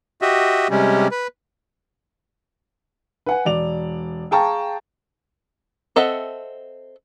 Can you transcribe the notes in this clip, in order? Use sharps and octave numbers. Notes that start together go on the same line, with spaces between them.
F#4 G4 D#5 E5
C3 G3 G#3 C#4
B4
B4 F#5 G#5
E1 D5 F7
G#4 F5 G5 A5 A#5 C#6
C4 A4 D#5 E5 F#5